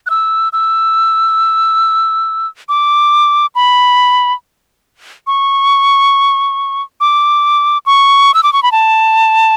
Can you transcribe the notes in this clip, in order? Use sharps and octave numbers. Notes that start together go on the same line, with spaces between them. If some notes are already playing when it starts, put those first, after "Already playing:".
F#6
E6
E6
D6
B5
C#6
D6
C#6
E6
D6
C#6
B5
A5